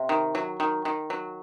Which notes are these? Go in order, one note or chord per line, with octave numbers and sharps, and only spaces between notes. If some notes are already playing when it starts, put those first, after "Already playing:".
Already playing: C3
D#3
F#3
D#3
D#3
F#3